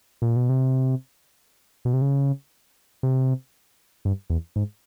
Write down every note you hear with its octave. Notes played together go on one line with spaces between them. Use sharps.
A#2
B2
C3
B2
C3
C#3
C3
G2
E2
G#2